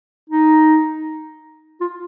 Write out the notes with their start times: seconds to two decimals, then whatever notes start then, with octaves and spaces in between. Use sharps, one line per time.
0.30 D#4
1.81 F4